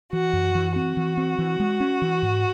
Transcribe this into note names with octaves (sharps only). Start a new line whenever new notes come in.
E3 F#4
F#2
E3
C4 F#4
E3
C4
E3
G#3
C#4
E3
G#2